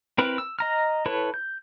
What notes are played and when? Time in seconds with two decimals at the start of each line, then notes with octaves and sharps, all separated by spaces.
0.18 C4 E4 A#4 B4 B5
0.38 E6
0.59 D#5 A#5 F6
1.06 E4 A4 B4 C#5
1.34 G6